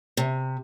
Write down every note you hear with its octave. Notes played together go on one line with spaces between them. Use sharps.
C3